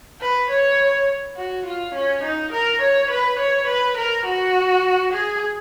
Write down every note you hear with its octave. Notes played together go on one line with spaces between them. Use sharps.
B4
C#5
F#4
F4
C#4
D#4
A#4
C#5
B4
C#5
B4
A#4
F#4
G#4